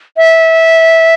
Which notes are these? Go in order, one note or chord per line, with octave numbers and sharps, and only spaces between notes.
E5